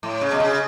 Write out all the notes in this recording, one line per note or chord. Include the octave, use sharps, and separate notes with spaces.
A2
C#3
B2
C#3